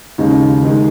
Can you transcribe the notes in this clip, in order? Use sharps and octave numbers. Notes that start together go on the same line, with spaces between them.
D#2 C#3 G#3 D#4
D#2 D#3 G#3